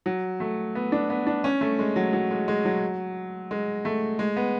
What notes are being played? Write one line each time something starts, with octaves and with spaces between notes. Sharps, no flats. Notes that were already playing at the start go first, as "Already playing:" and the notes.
F#3
A3
B3
D4
B3
D4
C#4
A3
G#3
F#3
F#3
G#3
G#3
F#3
G#3
A3
G#3
B3